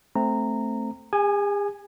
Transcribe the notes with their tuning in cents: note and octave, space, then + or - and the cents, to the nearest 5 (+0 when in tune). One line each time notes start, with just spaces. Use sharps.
A3 +0 C4 +0 A#5 -15
G#4 -45 G#5 +0